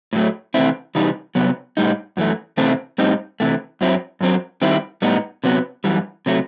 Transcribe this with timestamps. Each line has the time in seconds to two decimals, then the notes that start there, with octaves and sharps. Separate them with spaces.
0.13 A2 F#3 A3
0.54 C3 E3 A3 C4 E4
0.95 C3 E3 G3 D#4
1.35 C3 F#3 B3
1.77 A2 G3 D#4
2.17 F#2 E3 A3
2.57 E2 C3 E3 A3 C4
2.98 A2 G3 C4 D#4
3.40 C3 E3 A3
3.81 F#2 F#3 C4 E4
4.21 F#2 F#3 C4
4.62 D#3 G3 C4 E4
5.02 A2 G3 B3 D#4
5.44 C3 F#3 B3
5.84 F#2 E3 G3
6.26 C3 F#3 A3